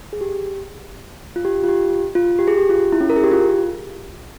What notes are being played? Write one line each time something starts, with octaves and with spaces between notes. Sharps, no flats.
G#4
G4
F4
G4
F4
G4
F4
G4
G#4
G4
F4
E4
C#4
A#4
G#4
G4
F4